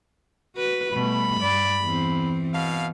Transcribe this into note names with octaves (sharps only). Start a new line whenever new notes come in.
F#4 B4
B2 G3 A3 B5
G2 D5
E2 E3 C4
B2 F5